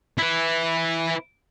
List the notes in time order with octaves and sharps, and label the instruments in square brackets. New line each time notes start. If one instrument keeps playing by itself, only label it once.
[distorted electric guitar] E4 B4